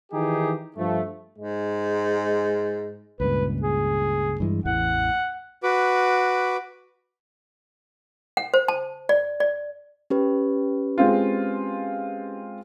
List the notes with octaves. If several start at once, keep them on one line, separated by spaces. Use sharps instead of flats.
D#3 E3 D#4 G4 G#4
G2 F3 A3
G#2 G#3
C#2 G2 A#2 B4
G#4
G2 E3 G#3
A1 E2 E3 F#5
F#4 B4 D6
F#5
C5
A5
D5
D5
C#4 G4 B4
G#3 C4 F4